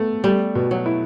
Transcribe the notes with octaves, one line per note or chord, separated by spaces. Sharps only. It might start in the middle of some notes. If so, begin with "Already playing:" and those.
Already playing: A3 B3
G3 A3
B2
F#3
E4